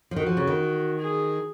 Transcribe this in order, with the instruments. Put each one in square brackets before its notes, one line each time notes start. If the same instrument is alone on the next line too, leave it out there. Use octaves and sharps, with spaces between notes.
[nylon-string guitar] F3
[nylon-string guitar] D#3 [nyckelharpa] F#4
[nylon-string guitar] F3
C#3
D#3
[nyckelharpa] G#4